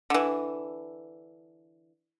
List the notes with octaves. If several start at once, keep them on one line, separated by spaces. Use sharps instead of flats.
D3 E3